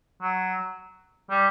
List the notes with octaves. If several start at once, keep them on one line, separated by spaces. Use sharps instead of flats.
F#3
G3